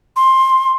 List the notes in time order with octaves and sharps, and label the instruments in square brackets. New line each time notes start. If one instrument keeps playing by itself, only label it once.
[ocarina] C6